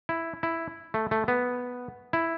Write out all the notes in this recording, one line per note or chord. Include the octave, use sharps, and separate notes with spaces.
E4
E4
A3
A3
B3
E4